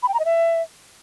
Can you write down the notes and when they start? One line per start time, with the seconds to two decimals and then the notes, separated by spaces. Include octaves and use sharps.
0.03 B5
0.08 G5
0.14 A#5
0.20 D#5
0.25 E5